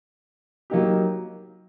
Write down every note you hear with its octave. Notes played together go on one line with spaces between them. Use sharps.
F#3 A#3 D#4 G4